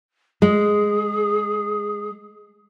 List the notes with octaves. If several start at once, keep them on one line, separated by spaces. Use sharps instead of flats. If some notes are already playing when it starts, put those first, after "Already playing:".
G#3 G#4